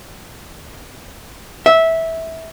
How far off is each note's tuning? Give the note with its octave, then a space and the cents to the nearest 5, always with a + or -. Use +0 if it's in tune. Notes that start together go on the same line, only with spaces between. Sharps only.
E5 -15